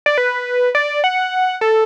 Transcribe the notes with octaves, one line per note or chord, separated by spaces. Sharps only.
D5
B4
D5
F#5
A4